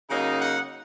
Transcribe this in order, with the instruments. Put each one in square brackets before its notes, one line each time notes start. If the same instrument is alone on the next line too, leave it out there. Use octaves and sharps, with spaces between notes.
[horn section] C#3 F#3 A#3 D#4
F#5